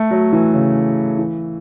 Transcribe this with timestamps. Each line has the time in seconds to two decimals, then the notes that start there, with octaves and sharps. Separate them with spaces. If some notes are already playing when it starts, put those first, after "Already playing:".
Already playing: A3
0.11 F#3
0.33 E3
0.53 C#3
1.18 E3